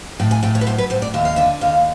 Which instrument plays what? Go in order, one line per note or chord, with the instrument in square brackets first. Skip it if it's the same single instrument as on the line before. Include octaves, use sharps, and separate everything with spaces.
[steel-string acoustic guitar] A2 G5
G#5
A2 G5
C#5
B4
F#3 C5
B4
A2 C5
D5
D#2 E5
F5
D3 E5
D#2 F5